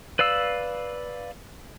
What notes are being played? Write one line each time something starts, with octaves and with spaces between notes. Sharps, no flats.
B4 D5 F5 E6